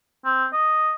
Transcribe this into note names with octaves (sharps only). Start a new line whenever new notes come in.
C4
D#5